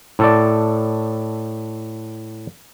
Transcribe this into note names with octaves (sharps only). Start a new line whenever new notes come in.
A2 A4 D5